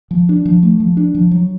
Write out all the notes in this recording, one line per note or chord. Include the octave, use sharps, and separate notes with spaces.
F3
D4
F3
A3
F3
D4
F3
F#3